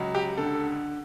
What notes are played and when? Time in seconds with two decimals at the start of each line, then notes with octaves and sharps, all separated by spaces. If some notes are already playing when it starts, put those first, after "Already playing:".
Already playing: C#2 F#3
0.15 G4
0.37 D3 A4